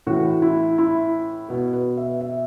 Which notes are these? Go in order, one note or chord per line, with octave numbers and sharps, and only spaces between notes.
A2 E3 F#4
E4
E4
B2 B4
B4
E5
E5